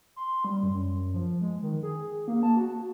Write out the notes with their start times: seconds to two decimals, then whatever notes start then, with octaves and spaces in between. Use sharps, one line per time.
0.16 C6
0.44 G3
0.63 F#2
1.14 F3
1.41 G#3
1.62 D#3
1.83 G#4
2.28 A#3
2.43 A5
2.56 F#4